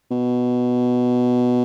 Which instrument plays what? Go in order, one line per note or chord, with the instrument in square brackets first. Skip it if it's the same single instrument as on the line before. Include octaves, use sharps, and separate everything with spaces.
[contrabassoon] B2